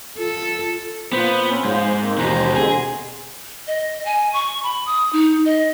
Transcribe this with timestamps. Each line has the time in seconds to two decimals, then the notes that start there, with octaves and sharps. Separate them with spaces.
0.18 F4 A4
1.13 A#2 B3 C5
1.48 C4 C#4
1.65 G#2 F3
2.00 A#3 C4
2.18 D#2 B2 E3 C5 A#5
2.56 B2 D3 C4 G#4
3.67 D#5
4.05 G#5
4.33 C#6
4.63 B5
4.86 D#6
5.13 D#4
5.45 D#5